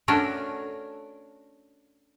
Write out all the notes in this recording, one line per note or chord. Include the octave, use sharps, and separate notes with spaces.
A3 C#4 D4 F#4 A#4